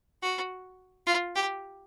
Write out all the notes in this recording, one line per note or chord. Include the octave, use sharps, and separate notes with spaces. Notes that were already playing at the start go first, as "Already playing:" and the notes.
F#4
F4
G4